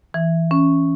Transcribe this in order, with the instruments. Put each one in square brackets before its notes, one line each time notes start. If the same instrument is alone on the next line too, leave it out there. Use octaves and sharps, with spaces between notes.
[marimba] E3
C#4